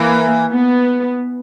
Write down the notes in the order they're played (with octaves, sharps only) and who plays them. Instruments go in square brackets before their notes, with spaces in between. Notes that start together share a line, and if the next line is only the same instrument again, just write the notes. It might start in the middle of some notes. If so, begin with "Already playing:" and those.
Already playing: [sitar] E3 [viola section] A#3
[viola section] B3